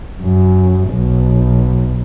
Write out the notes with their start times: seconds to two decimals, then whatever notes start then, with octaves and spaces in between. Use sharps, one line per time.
0.22 F#2
0.90 B1